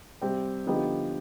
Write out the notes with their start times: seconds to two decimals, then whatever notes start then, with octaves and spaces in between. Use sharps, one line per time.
0.21 C3 G3 C4 G4
0.66 D3 F3 B3 D#4 G4